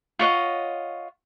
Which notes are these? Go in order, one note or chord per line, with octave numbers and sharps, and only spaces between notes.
F4 C#5 D#5 F#5